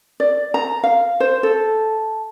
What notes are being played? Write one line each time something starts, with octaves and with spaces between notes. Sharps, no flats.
D5
A#5
F5
C5
A4